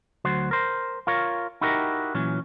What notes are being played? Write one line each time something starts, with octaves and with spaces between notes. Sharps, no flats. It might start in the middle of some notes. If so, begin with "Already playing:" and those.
D2 F#3 F#4 C5
A#4 C5
F4 A#4 C#5
D#4 E4 F#4 G4 A#4
A#2 E3 F#3 C#4